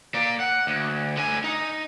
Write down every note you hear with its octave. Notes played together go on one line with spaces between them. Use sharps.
A#3 D5
F#5
D2
D3 G#5
D#4